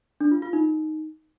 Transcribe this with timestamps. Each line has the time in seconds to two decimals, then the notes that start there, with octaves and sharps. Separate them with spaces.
0.21 D4
0.31 F4
0.42 F4
0.53 D#4